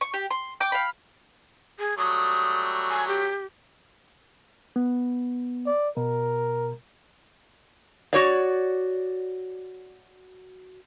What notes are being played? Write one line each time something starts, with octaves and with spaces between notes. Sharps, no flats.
C#6
G4
C6
G5 D6
F5 B5
G#4
F#3 G3 A3 D#6
G#5
G4
B3
D5
B2 A#4
F#4 C#5 D5